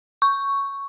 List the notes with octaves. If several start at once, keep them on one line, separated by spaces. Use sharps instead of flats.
C#6